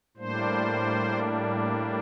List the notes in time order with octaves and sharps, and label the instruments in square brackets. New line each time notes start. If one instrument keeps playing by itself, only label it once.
[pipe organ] A2 G3 A#3 D4 C5